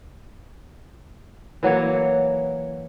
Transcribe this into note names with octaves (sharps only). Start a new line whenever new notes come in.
E3 F#3 A#3 C#5